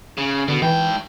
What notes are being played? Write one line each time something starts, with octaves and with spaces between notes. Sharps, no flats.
C#3
B2 D3
G#2 E3 G5